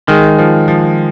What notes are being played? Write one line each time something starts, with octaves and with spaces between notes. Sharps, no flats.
D#3 G#3
F3
F3